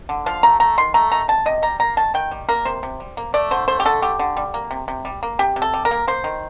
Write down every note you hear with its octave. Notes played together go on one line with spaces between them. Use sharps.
D3
F3 F5
A3 A#5
A3 A#5
D#3 C6
A3 A#5
D#3 A#5
C3 A5
C3 D#5
G3 A#5
A#3 A#5
D#3 A5
D#3 G5
G3
A#3 A#4
C3 C5
C3
G3
A#3
A3 D5
D3 C5
A3 C5
G4
D3 A4
D3 G4
D3
G3
A#3
C3
C3
G3
A#3
C3 G4
C3
A4
G3
A#4
A#3
A#3 C5
D#3